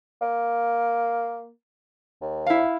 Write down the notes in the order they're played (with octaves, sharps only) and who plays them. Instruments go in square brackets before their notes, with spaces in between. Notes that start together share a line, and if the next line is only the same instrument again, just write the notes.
[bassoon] A#3
D#2
[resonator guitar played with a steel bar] E4 F5